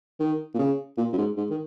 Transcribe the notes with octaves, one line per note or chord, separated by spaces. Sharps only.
D#3
A#2
C#3
A#2
F#2
G#2
G#2
D#3